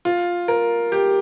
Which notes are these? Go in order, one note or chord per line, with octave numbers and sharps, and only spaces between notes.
F4
A#4
G4